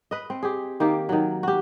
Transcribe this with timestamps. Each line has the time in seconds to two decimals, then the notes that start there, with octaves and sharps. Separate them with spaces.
0.11 B4 D#5
0.30 C4
0.43 G4 G#4
0.80 D#3 A#3 G4
1.09 D#3 F#3
1.43 F#4 G4